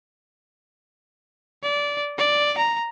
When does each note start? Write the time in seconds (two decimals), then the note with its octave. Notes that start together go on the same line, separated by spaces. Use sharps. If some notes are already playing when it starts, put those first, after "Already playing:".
1.63 D5
2.18 D5
2.58 A#5